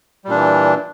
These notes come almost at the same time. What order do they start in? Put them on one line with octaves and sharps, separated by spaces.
G3 A#2 D4 E3